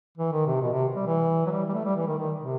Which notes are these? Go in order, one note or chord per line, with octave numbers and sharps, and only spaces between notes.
E3
D#3
C3
B2
C3
G3
E3
F#3
G3
G3
A3
G3
E3
D#3
D#3
C3